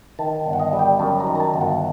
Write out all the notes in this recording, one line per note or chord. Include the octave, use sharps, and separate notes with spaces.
D#3 A5
G1
F#5
D#5
G3
G5
F#2 A5
A#5
D#3
A#5
A5
G1
F#5